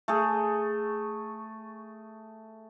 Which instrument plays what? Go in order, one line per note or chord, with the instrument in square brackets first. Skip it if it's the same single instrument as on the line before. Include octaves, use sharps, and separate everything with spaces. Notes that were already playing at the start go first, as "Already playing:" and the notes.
[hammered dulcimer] A3 G#4